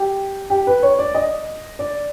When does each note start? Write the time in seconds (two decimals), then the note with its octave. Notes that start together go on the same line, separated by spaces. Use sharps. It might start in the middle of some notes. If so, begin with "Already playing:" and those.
Already playing: G4
0.50 G4
0.67 B4
0.83 C#5
0.99 D5
1.15 D#5
1.79 D5